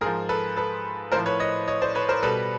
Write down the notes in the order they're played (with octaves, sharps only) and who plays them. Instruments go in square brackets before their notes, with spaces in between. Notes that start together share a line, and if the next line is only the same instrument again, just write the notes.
[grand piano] G#2 G#4 A#4
F3
A4 B4
A4 B4
A2 A#4 C5
F3
B4 C#5
C#5 D#5
C#5 D#5
C5 D5
B4 C#5
A#4 C5
B2 G3 A4 B4